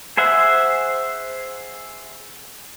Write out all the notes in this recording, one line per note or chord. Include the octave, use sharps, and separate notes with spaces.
G#4 C5 E5 F#5